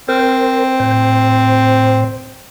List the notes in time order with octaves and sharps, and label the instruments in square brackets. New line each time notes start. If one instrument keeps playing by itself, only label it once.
[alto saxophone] C4 [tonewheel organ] A#4 C5
[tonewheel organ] A2 C5